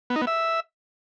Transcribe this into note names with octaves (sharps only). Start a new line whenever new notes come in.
B3
D#4
B3
E5